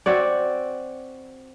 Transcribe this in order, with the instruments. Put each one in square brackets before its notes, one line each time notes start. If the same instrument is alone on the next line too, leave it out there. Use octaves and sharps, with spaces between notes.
[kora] C4 F#4 C#5 D5